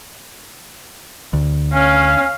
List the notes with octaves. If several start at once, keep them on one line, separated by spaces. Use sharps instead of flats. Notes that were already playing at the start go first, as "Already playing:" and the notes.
D2
C#4 F5